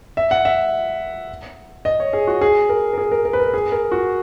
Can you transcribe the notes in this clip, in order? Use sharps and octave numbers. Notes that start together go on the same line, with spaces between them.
E5
F#5
E5
D#5
C#5
G#4
F#4
G#4
A#4
A#4
G#4
A#4
A#4
B4
A#4
G#4
A#4
F#4